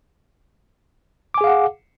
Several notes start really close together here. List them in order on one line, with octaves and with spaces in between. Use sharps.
D6 G#5 G#4 F5 F#5